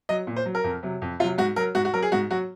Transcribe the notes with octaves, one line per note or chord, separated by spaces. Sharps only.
F#3 D#5
A#2
C5
F#3
A#4
F2
C3 F#3
F2
C3 F#3 F4
G#2 F#4
F#3 A#4
G#2 F#4
F#4
F#3 A#4
G#4
G#2 F#4
F#3 F#4